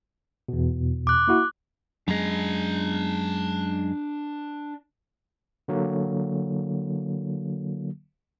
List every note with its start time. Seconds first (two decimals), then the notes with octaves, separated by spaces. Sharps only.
0.48 E2 B2
1.07 D6 F#6
1.27 A#3 E4 F#4
2.08 F#2 G#3 D4 A#5
5.68 D3 F#3 A#3